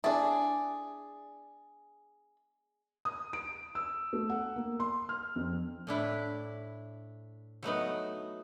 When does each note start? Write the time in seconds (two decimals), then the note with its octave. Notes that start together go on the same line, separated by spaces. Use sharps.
0.04 D4 E4 G#4 D5
3.05 D#6
3.33 D7
3.75 E6
4.13 A3
4.29 F#5
4.56 A#3
4.80 C6
5.09 F6
5.36 F2
5.87 A2 D4 E4
7.63 F#3 A3 B3 D#4